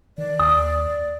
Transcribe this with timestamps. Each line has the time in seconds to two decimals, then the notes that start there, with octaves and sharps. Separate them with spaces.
0.18 D#3 D5
0.39 D#2 D#6